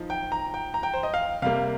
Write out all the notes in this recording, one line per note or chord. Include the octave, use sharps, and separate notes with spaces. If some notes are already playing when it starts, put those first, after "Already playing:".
Already playing: F3 D#4
G5
A#5
G5
A#5
G5
C5
D#5
F5
C3 G3 A#3 F5